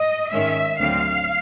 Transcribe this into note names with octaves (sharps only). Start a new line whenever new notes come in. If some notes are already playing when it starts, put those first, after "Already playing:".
Already playing: D#5
G#2 D#3 G#3 C#4 E5
D2 D3 F#3 A3 C4 F5